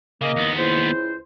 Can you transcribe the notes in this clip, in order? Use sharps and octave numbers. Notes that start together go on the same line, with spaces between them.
C#3 A#3 D#5
D#2 B3
C#2 E4 C5